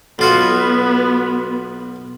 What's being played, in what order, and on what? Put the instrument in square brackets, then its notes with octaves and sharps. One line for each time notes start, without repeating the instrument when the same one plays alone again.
[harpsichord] B1 F4 F#4 [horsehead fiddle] B3